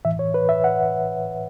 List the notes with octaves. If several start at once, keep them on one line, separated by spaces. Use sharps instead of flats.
A2 E3 E5
C#5
B4
E5
F#5